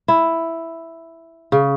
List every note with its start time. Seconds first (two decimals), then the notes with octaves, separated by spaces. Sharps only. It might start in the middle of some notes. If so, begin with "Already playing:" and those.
0.08 E4
1.52 C#3